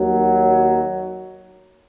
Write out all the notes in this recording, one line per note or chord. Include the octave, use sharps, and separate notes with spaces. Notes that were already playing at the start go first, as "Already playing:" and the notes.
Already playing: D#2 D#3 F#3